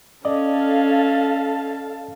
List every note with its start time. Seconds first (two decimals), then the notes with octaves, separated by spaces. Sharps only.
0.25 C#4 A4 D5 D#5 F5 A5